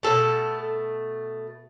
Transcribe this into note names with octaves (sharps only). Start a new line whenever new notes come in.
B2 A3 A4